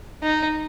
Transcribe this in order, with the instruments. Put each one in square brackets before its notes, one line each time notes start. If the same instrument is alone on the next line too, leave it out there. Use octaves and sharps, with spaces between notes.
[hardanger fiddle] D#4